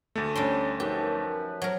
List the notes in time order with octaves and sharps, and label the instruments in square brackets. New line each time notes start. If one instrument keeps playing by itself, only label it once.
[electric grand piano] D2 A3
[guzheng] G3 G5 C6 [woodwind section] C#4 D4
[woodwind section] F#2 F3 B4 [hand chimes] D#4 A#4 [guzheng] G4
[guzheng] F#3 A#4